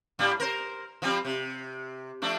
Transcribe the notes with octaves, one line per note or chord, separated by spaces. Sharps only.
A2 G3 D4
A#4 C5
F3 G3 C4
C3
F3 A3 D4